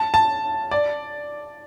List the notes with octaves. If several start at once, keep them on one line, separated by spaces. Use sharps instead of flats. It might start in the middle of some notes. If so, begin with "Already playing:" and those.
Already playing: A5
A5
D5